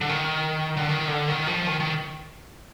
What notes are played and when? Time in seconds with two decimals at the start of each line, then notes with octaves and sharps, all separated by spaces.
0.01 D3
0.09 D#3
0.77 D3
0.89 D#3
1.08 D3
1.28 D#3
1.47 F3
1.67 D#3
1.80 D#3